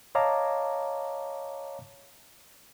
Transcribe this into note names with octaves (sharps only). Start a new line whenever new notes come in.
C#5 D#5 F5 A5 A#5 D6